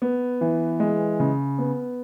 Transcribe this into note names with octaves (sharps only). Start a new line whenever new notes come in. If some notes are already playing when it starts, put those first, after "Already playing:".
B3
E3
G#3
C#3
B3